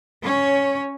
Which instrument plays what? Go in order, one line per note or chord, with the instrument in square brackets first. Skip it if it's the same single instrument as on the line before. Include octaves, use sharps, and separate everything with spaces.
[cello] C#4 C#5